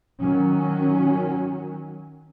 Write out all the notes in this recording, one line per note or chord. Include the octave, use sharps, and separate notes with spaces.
D#3 F#3 C#4